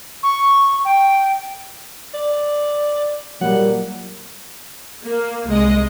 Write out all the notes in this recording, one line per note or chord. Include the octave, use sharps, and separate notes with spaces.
C#6
G5
D5
A#2 F#3 G3 A#3 F#5
A#3
C2 G#3 D#5